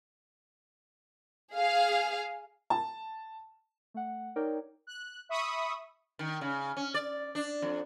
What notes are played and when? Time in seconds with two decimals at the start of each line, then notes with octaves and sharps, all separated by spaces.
1.54 G#4 F5
2.70 A5
3.94 A3 F#5
4.36 D#4 A#4 C#5 D5 G5
4.87 F#6
5.29 E5 B5 C#6 D#6
6.19 D#3
6.41 C#3
6.77 C#4
6.94 D5
7.35 D4
7.62 F2